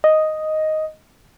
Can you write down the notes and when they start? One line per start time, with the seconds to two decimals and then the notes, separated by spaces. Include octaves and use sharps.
0.04 D#5